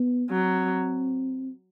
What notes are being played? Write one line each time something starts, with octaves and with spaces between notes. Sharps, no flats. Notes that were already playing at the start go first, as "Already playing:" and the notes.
Already playing: B3
F#3 C4